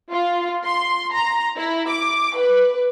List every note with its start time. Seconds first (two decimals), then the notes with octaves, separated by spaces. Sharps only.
0.11 F4
0.65 C6
1.12 A#5
1.57 E4
1.90 D6
2.38 B4